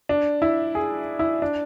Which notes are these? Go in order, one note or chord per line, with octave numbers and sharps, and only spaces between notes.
D4
E4
G#4
E4
D4